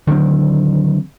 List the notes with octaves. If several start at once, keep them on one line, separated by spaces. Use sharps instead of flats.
D3 D#3 F#3 C4